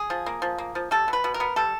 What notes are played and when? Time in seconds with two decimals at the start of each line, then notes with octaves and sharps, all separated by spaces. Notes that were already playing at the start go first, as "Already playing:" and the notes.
Already playing: G#4
0.10 F3
0.26 A#3
0.42 F3
0.58 A#3
0.75 F3
0.91 G3 A4
1.08 B2
1.13 B4
1.24 B2
1.34 A#4
1.40 B3
1.56 G3 A4